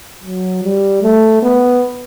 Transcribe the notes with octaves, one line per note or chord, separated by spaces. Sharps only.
F#3
G3
A3
B3